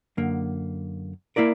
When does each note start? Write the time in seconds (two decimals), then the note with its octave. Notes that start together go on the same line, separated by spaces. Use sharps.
0.17 F#2 D3 A#3
1.36 A#3 E4 A#4 D5